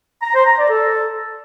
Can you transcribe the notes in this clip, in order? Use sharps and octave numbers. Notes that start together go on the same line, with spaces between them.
A#5
C5
A#5
D5
A4